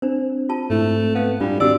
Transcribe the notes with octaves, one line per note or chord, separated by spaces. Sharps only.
C4 D4 C5
F4 A5
G#2 A3 C4 E4
B3 F5
G#2 G3 D4 F4 G5
D#3 C4 D4 F#4 G4 D5 E6